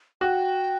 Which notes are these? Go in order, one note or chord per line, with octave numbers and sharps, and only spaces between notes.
F#4 G5